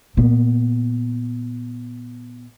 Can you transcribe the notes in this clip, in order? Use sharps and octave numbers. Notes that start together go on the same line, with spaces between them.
A#2 B3